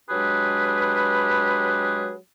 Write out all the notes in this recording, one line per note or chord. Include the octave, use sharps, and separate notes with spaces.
F#3 G#3 D4 G4 G#4 B4